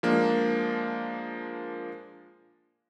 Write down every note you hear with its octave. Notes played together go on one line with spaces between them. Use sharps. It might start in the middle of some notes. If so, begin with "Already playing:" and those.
F3 G#3 A#3 D4